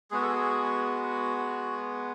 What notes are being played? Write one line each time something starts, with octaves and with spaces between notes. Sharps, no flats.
G#3 B3 F#4 G#4
A4
G#4
F#4